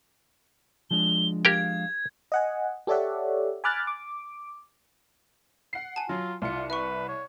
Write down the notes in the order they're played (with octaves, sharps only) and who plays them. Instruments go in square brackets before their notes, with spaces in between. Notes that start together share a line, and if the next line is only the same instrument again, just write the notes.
[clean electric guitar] F3 G#3 D4 [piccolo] G7
[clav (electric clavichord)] G4 A#4 G5 [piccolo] F5 [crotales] G#6
[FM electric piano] D#5 F#5 G#5
G4 A4 C#5 D5 E5 F#5
G#5 B5 D6 F6 F#6 A6
D6
[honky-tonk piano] F#5 C7
[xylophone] G#5 A5
[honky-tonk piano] F#3 [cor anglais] F4
[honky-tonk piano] C2 C#7 [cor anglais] F4
[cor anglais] B4 [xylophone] E5 C#6
[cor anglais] C#5